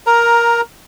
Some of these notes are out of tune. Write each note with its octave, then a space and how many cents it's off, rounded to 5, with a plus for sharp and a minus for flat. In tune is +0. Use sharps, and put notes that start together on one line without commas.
A#4 +10 A#5 +0